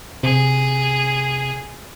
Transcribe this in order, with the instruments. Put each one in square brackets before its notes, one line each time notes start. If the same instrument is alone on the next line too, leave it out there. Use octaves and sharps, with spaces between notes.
[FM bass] C3 [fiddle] G#4